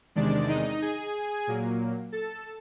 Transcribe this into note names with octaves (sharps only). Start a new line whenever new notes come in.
E2 C3 D#3 G#3 D4 D5
D#4 D#5
G#4 G#5
A#2 F#3 A#3
A4 A5